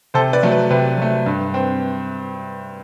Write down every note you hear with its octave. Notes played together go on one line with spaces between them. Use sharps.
C3 A4 C5
B4 D5
F#3 A3
B4
C3 B4
F#3 A3
G2
C4